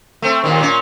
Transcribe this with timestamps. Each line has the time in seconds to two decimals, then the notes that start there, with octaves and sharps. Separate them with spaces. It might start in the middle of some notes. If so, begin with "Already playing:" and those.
0.22 A3 C4
0.44 D#2 A#2 D#3
0.61 A#2 C#4